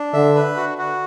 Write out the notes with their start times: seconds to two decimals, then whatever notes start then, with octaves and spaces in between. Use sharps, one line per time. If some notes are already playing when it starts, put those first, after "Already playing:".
Already playing: D4
0.13 D3 E5
0.35 B4
0.56 F#4
0.78 F#4